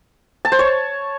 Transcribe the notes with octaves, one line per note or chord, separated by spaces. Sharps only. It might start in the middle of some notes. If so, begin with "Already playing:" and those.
A5
C5
C#5